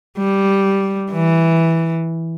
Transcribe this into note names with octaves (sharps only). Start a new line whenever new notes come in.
G3
E3